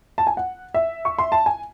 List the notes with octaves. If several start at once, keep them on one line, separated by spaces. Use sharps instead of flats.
A5
G#5
F#5
E5
C#6
C6
A5
G#5